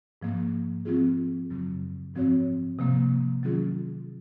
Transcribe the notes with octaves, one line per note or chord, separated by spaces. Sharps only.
G#2 F3 A#3
F3 C4 F4 G#4
F#2 C#3 F#3
G#2 F3 C4 F#4 C#5
C3 F3 A#3
D#3 F#3 C#4 F4 G#4